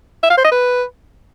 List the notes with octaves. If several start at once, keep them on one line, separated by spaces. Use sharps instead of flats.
E5
F5
C5
D#5
B4